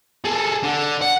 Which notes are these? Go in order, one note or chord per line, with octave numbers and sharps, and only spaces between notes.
G#4 A4
D3
F#5